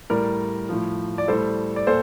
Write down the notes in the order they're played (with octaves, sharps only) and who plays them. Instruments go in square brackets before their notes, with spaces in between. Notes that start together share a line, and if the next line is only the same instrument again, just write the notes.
[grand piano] A2 G3 A#4 D5
A2 F3
D5
A2 G3 A4 C5
D5
A#2 A4 C5